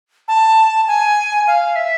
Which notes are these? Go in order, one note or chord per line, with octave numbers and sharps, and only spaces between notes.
A5
G#5
F5
E5